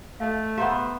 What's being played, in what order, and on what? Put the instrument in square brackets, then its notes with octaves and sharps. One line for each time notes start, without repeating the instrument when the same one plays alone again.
[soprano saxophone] A3 [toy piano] A4 D#5 F5
[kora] B3 C5 E5 [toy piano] G4 F5 A#5